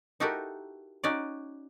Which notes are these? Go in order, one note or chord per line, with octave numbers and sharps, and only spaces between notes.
D#4 E4 F#4 G4 A4 A#4
C#4 D#4 F#4 D5